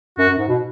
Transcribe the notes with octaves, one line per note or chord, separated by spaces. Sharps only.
F#2 F#4
F#2
G#2
B2